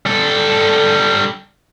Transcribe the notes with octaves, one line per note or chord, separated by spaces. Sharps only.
G3 A4